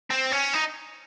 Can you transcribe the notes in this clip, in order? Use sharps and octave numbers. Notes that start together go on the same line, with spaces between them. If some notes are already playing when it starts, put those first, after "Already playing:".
C4
C#4
D#4